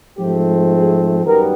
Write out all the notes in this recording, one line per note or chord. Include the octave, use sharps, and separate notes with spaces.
G#2 F3 A3 C4 G4
G#4
F#2 D#3 G3 B3 A#4